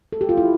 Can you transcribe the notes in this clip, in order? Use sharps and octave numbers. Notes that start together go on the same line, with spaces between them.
A4
G4
F4
E4